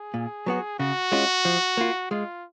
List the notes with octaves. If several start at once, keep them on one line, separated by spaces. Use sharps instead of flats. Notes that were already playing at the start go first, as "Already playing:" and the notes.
Already playing: G#4
A#2
F#3 B3 F#4
C#3 F#4
G#3 C#4 F4
F3
A#3 F4
G#3 F4